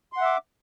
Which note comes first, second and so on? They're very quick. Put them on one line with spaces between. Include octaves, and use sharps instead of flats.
C6 F#5 E5 D6